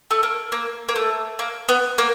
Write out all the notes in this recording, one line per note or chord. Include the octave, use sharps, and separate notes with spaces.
A3
A#3
A#3
A#3
A3
A#3
B3
A#3